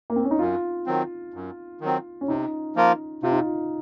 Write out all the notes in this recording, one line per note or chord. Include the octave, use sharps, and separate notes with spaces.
A#3
C4
C#4
D#4
F#2 F4
D#3 F#3 C4
F#2
D#3 F#3 C4
C#4
C3 D#4
F3 A#3 F4 A#4
C3 F4
D#4
F4